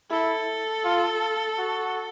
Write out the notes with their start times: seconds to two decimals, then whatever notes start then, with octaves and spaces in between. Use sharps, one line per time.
0.10 E4 A4
0.84 F4
1.58 F#4